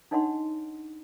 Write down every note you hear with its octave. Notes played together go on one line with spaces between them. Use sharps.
D4 D#4 C#5 D#5 F#5 C6